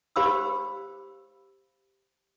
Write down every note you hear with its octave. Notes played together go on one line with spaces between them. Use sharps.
G4 C5 F5 B5 D6 E6